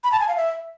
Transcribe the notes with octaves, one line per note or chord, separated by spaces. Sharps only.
B5
A5
G#5
F5
E5